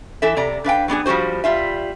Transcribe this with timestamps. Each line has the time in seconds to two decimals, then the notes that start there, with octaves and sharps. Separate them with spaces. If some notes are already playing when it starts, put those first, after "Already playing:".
0.22 E3 A4 E5
0.37 C3 D5 A#5
0.64 D4 B4 F5 G5
0.88 F#3 B3 D4 G#4
1.06 F3 G3 E4 F#4 C5
1.44 G3 F4 E5